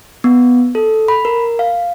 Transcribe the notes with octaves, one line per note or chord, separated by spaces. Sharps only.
B3
A4
B5
A#4
F5